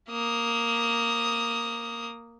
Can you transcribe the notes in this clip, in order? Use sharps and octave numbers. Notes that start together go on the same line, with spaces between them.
A#3 D#6